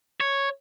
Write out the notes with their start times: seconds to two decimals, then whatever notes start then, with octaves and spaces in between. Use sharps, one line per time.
0.20 C#5